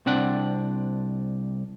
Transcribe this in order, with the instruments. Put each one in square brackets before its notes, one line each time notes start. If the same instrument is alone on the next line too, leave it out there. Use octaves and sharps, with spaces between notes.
[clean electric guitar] C2 C4 D4 F#5